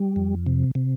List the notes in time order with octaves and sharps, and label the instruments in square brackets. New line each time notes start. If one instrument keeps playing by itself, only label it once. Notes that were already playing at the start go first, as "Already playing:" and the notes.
Already playing: [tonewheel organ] G3
F2
C3
C3